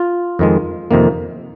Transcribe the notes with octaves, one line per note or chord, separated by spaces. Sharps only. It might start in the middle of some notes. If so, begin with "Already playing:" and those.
Already playing: F4
F2 D#3 G#3
F2 C3 D#3 A#3